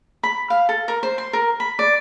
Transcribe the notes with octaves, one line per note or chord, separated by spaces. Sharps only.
B5
F5
A4
A#4
C5
C6
A#4
B5
D5